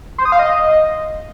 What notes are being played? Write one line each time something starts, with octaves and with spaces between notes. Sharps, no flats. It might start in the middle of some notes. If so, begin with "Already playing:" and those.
C5
D#6
F5
D#5